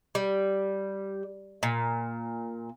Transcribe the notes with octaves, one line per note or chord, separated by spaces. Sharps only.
G3
A#2